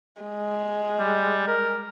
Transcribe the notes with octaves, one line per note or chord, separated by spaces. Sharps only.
G#3
G3
A#4